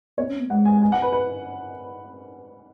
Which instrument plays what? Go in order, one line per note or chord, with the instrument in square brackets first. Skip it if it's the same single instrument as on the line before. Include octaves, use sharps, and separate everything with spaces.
[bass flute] B3 [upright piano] C#5
[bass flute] C#4
B3
[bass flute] G#3 [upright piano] F#5
[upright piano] G#5
G#5
F#5
B4
B4